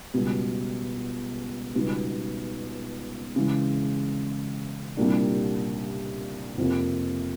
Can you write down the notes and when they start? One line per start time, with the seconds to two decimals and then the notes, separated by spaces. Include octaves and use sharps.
0.14 C#2 B2 G3
1.75 C#2 B2 G3 B3 D#4
3.36 C#3 E3 G#3
4.97 C2 A#2 G3 A#3 D4
6.58 F2 C3 F3 A#3